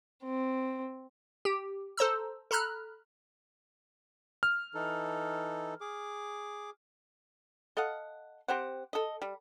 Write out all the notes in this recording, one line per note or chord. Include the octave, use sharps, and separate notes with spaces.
C4
G4
A4 C5 A#5 E6
A4 A#5 B5 F6 F#6
F6
E3 D#4 A4
G#4 D6
A4 D#5 F5 F#5
C4 G4 C5 F#5
A4 D#5
G3